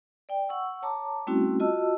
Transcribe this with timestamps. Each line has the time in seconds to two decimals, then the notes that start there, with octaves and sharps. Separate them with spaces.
0.29 D5 G5
0.49 F#5 C#6 E6
0.82 C#5 A5 A#5 D6
1.27 G3 A3 C4 C#4 E4 F#4
1.60 F4 F#4 D#5 A5 E6